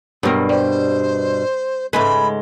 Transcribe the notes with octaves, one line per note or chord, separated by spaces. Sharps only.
G2 B2 F#3 C4 A#4
G3 C5
G#2 C#3 G#3 A3 B4 B5